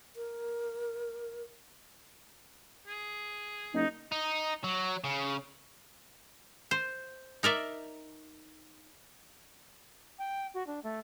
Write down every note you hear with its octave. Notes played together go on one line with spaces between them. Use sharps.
A#4
G#4
F#1 D#4
D#4
F#3
C#3
C5
D#4 A#4 D5 E5
G5
F#4
D4
A3